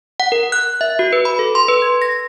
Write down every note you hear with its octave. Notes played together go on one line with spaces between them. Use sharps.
F#5
A#4
F#6
E5
F#4
B4
B5
A4
C6
B4
G#6
A#6